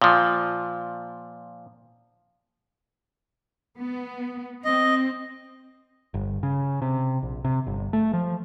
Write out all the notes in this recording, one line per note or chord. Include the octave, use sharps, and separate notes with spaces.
A#2 F3
B3
C4 D#5
G1
C#3
C3
A#1
C3
G1
A3
F3